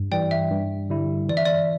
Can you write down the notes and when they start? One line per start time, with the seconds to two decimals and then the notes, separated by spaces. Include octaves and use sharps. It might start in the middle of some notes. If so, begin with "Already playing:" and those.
Already playing: G2
0.12 E3 G3 D5 G5
0.31 E5
0.51 G2
0.90 D3 G3 E4
1.29 E3 D5
1.37 E5
1.45 D5